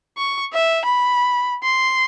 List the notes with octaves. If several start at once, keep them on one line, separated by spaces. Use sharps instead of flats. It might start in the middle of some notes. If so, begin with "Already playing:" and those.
C#6
E5
B5
C6